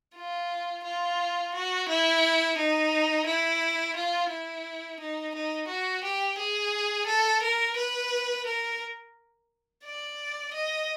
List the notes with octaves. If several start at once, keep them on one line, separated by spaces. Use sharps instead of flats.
F4
F4
F#4
E4
D#4
E4
F4
E4
D#4
D#4
F#4
G4
G#4
A4
A#4
B4
A#4
D5
D#5